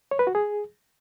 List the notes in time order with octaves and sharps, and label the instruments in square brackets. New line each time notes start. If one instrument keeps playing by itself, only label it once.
[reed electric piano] C#5
B4
F#4
G#4